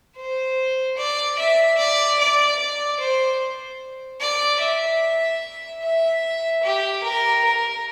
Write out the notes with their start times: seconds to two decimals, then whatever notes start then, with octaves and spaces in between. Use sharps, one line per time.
0.16 C5
0.97 D5
1.38 E5
1.78 D5
2.19 D5
2.59 D5
3.00 C5
4.20 D5
4.60 E5
5.82 E5
6.63 G4
7.04 A#4
7.44 A#4